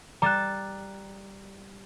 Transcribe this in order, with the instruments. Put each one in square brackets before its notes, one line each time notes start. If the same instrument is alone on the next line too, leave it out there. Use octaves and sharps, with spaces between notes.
[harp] G3 A6 E7 [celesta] A#5 F#6